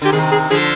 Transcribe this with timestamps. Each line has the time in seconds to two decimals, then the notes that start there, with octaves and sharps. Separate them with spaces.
0.02 D3 G4
0.12 C3 D#3 G#4
0.31 G#4
0.50 D3 F3 G#4